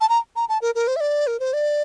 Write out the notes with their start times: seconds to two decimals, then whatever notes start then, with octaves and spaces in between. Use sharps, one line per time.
0.01 A5
0.09 A#5
0.36 A#5
0.49 A5
0.62 A#4
0.75 A#4
0.87 C5
0.96 E5
1.00 D5
1.27 A#4
1.40 C5
1.53 D5